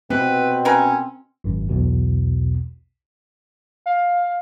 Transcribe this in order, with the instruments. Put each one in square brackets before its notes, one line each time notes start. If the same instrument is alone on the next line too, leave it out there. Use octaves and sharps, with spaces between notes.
[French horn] B2 [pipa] E3 [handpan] C4 [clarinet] B4
[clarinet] C#4 [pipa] A#4 B4 G#5
[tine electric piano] G#1 F#2
B1 E2 B2
[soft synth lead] F5